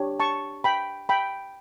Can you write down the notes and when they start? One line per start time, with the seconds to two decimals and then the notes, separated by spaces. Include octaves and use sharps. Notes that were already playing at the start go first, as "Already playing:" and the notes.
Already playing: D4 G4 C#5
0.20 A5 C#6
0.64 G5 B5
1.09 G5 B5